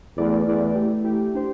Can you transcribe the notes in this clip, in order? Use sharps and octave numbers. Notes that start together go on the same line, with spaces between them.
E2 A3 E4 B4 D5
E2 A3 E4 B4 D5
A3 E4 G4
A3 E4 G4
A3 D4 G4 C5